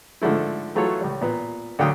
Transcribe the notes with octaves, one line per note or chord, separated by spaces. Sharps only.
G#2 D3 F3 A3 E4
E3 F#3 A3 F4 A4 C#5
C#2 G3
A#2 B3
D2 D3 F#3 F5 G5 D#6